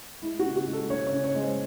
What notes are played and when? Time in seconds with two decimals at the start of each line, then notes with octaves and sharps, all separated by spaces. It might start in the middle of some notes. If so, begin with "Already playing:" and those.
0.22 G#3 E4
0.39 F#4
0.45 C#3
0.56 F#4
0.67 G#3
0.73 A4
0.90 C#3 C#5
1.07 C#5
1.12 C#3
1.24 C#5
1.35 G#3
1.40 C5